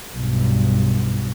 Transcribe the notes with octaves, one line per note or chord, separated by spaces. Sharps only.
B1 G2